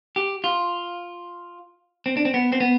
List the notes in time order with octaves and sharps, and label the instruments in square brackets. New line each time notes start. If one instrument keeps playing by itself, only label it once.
[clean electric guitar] G4
F4
C4
D4
C4
B3
C4
B3